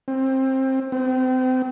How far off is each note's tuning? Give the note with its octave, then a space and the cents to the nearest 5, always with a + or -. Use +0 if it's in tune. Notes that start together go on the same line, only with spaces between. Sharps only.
C4 +20
C4 -30